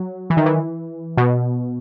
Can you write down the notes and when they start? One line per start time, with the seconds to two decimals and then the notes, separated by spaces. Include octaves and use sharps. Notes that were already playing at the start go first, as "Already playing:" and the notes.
Already playing: F#3
0.30 E3
0.37 D#3
0.46 E3
1.17 B2